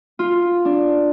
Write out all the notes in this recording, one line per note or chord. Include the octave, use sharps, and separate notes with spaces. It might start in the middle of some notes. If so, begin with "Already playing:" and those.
F4
D4